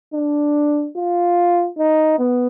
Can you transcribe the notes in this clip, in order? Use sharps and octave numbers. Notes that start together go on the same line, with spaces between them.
D4
F4
D#4
B3